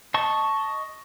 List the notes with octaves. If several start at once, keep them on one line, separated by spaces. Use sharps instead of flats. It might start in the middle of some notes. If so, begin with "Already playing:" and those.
D#5 A5 C#6